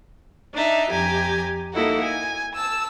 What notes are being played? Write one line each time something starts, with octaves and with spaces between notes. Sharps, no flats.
D4 D#4 E5
F2 G4 G#5 A#5
A#3 D#4 E4 F#4 A4
G#5
A5 E6